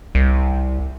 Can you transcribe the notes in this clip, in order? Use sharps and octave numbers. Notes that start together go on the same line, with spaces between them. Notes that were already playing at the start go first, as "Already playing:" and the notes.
C2